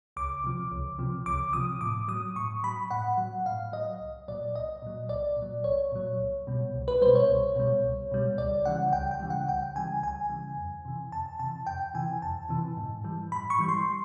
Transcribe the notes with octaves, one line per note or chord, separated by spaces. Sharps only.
C#2 D6
C3 F3
C#2
C3 F3
C#2 D6
C3 F3 D#6
A2 D6
F#3 D#6
A2 C#6
F#3 B5
A2 F#5
F#3
A2 F5
F#3 D#5
C2
A#2 F#3 D5
C2 D#5
A#2 F#3
C2 D5
A#2
F#3
C2 C#5
A#2 F#3
C2
B2 G3
C2
B4
B2 G3 C5
C#5
C2
B2 G3
C2
B2 G3
C#2 D5
C#3 E3 G3 F#5
C#2 G5
G5
C#3 E3 G3
F#5
C#2 G5
C#3 E3 G3 G#5
C#2 G#5
C#3 E3 G3
F2
C3 E3
F2 A5
C3 E3 A5
F2 G5
C3 E3 G#5
F2 A5
C3 E3
G#2
E3 G3
G#2 B5
C#6
E3 G3
C6